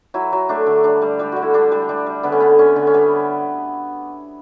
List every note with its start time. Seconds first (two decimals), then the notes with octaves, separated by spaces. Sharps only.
0.14 F#3 E4
0.33 F#3
0.49 A3 D4
0.66 D3
0.84 G3 D4
1.02 G3
1.19 G3 G4
1.32 D3 F#4
1.42 E4
1.54 G3 D4
1.72 G3
1.89 G3 D4
2.06 G3
2.23 D3 B3
2.32 C#4
2.40 D3 B3
2.59 D3 C#4
2.76 D3
2.87 C#4
2.94 G3 B3